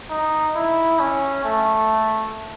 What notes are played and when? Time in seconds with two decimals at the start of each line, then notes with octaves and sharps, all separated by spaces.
0.10 D#4
0.56 E4
1.00 C#4
1.45 A3